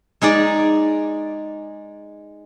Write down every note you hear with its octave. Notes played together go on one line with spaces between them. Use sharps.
G#3 D#4 G#4 D5